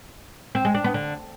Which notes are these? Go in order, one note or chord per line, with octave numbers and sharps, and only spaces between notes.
C4
G#3
D4
B3
D3